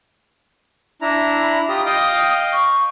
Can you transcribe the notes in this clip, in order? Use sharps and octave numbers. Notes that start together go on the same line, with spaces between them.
D4 E4 A#5
B5
F4 G4 D#6
D#5 F5 G5 D#6
C#6